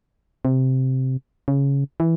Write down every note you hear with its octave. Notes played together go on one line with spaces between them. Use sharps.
C3
C#3
E3